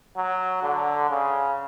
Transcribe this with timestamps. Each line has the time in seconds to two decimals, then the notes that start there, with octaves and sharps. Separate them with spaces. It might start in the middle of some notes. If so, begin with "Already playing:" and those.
0.17 F#3
0.63 D3
1.10 C#3